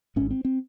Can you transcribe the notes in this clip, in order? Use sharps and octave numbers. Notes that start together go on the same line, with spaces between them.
G#1 G#2 C#4
C4
C4